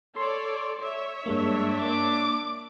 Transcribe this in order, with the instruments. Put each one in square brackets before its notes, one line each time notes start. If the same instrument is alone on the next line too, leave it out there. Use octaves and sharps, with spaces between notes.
[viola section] A4 C#5 D5 [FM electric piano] C6
[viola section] C#5 E5
[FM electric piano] G2 G#3 A#3 [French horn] D4
[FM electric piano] A#3 [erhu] D6